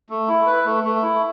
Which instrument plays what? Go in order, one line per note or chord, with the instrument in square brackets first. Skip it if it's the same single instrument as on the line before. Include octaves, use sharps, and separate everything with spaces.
[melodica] A3
E4
B4
A3
A3
E4